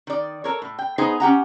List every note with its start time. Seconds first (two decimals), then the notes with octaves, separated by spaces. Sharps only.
0.07 D#3 D5
0.44 A4 A#4 C#5
0.62 A2
0.79 G5
0.98 B3 D#4 G#4 C5
1.20 C#4 G4 F#5 A#5